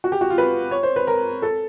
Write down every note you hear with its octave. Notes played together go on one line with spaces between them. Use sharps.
F#4
G4
F#4
F4
B4
C#5
C5
B4
A#4
A4